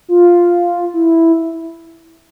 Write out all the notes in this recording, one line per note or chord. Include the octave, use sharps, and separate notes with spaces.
F4
E4